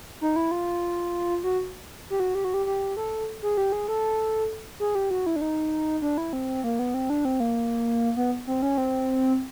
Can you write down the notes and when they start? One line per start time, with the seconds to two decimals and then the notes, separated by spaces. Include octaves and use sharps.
0.21 D#4
0.36 E4
0.51 F4
1.44 F#4
2.10 G4
2.20 F#4
2.35 G4
2.45 F#4
2.54 G4
2.66 G4
2.97 A4
3.43 G#4
3.57 G4
3.72 G#4
3.88 A4
4.80 G#4
4.95 G4
5.11 F#4
5.26 E4
5.36 D4
5.41 D#4
6.02 D4
6.18 E4
6.33 C4
6.64 A#3
6.79 B3
6.94 C4
7.10 D4
7.25 C4
7.40 A#3
8.17 B3
8.47 C4
8.62 C#4
8.78 C4